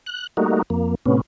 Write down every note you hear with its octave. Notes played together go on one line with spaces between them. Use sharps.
F#6
G3 A3 A#3 D#4 F#4
F2 A#3
A2 C3 B3 C#4